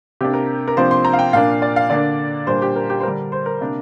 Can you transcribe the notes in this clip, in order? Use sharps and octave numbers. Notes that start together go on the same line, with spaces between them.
C3 A#3 D4 G4
A#4
A#4
C3 F3 A#3 D4 C5
C6
A#5
F5
G5
A#2 A#3 D4 F5
D5
F5
D3 A#3 D4 D5
A#2 G3 A#3 D4 C5
G4
A#4
G4
C5
D3 G3 D4 A#4
C5
A#4
C3 A#3 D4